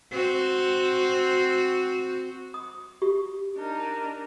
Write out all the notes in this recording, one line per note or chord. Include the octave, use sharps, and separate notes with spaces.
C4 F#4
D#6
G4
D4 D#4 A#4